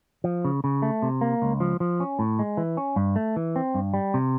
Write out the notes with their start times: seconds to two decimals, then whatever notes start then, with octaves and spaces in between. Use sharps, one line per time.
0.24 F3
0.45 C#3
0.64 C#3
0.82 A3
1.02 C3
1.21 A#3
1.42 C#2
1.60 F3
1.80 F3
2.00 C#4
2.19 A2
2.39 G#3
2.57 E3
2.77 C#4
2.96 G2
3.16 A3
3.36 E3
3.56 C4
3.75 G2
3.94 G3
4.14 C3